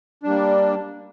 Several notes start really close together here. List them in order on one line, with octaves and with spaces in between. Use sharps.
D4 G3 A#3